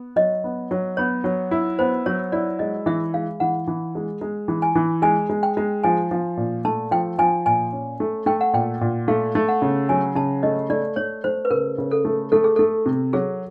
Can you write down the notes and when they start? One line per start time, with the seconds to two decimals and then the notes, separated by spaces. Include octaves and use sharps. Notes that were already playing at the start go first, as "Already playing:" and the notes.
Already playing: B3
0.16 F#3 D#5
0.44 B3
0.71 F#3
0.97 B3 C#5
1.24 F#3
1.51 E4
1.79 B3 C5
2.06 F#3 C#5
2.32 E4 D5
2.59 G#3 D#5
2.86 E3 E5
3.14 G#3 F5
3.40 E3 F#5
3.67 E3
3.95 G#3
4.21 G#3
4.48 E3
4.62 G#5
4.75 E3
5.02 G#3 G#5
5.30 G#3
5.43 G5
5.57 G#3
5.84 F3 G#5
6.11 F3
6.37 A#2
6.65 A3 A5
6.91 F3 G5
7.18 F3 G#5
7.46 A#2 G#5
7.73 C#4
8.00 A3
8.26 A3 G5
8.41 F#5
8.53 A#2 G5
8.81 A#2
9.08 A3 F5
9.35 A3
9.48 F#5
9.62 C#3
9.89 F#3 G#5
10.15 C#3 A5
10.43 A3 D#5
10.70 A3 D5
10.96 A3 C#5
11.24 A3 C5
11.45 B4
11.50 C#3 A#4
11.78 C#3
11.91 A4
12.05 A3
12.32 A3 A4
12.44 G#4
12.56 A3 A4
12.86 C3
13.13 F#3 G#4